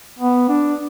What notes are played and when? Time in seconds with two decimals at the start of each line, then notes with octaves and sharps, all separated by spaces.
0.19 B3
0.49 D4